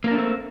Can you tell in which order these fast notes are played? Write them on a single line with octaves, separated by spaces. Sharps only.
A#3 A#4 D4 A3 C4